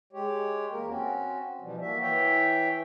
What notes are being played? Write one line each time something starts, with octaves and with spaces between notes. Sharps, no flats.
G#3 G4 C#5
E2 A#3 A#4
C4 C#4 F#4
B2 E3 F3 G3
A#3 F#4 E5
E3 C#5 E5 G5